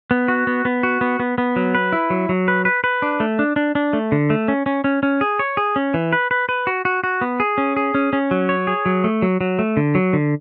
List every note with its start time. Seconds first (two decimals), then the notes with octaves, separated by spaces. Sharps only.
0.11 B3
0.28 F#4
0.47 B3
0.65 B3
0.83 F#4
1.01 B3
1.20 B3
1.38 B3
1.56 F#3
1.75 B4
1.93 E4
2.10 F#3
2.29 F#3
2.48 B4
2.65 B4
2.84 B4
3.02 D4
3.20 A3
3.39 D4
3.56 D4
3.75 D4
3.93 A3
4.12 D3
4.30 A3
4.48 C#4
4.66 C#4
4.84 C#4
5.03 C#4
5.21 G#4
5.39 C#5
5.57 G#4
5.76 C#4
5.94 E3
6.13 B4
6.31 B4
6.49 B4
6.67 F#4
6.85 F#4
7.04 F#4
7.21 B3
7.40 G#4
7.58 C#4
7.77 G#4
7.95 C#4
8.13 C#4
8.31 F#3
8.49 C#5
8.67 G#4
8.86 F#3
9.04 A3
9.22 F#3
9.41 F#3
9.59 A3
9.77 D3
9.95 F#3
10.13 D3